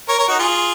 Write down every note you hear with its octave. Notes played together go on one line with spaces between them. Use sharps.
A#4 C#5
A#4 C#5
D#4 F#4
F4 G#4